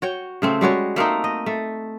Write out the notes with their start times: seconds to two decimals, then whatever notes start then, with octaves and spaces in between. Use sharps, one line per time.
0.02 F#4 C#5 G5
0.42 C#3 A3 C4
0.61 G3 G#3 F#4 C#5
0.96 A3 A#3 C4 D#4
1.24 D#5
1.46 A3